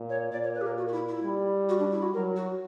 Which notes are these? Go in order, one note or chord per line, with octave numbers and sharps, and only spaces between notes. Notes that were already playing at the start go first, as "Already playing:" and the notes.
Already playing: A#2
C#5
A#2 D5
C#5
B4
G4
A#4
F#4
F#4
E4
E4
G3
F#4
D4
E4
F#4
F#3 A#4
F#4